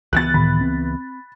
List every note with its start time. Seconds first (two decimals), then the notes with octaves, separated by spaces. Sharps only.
0.13 C#2 E3 B3 F#6 A6
0.34 A2 D#3 B5
0.61 C4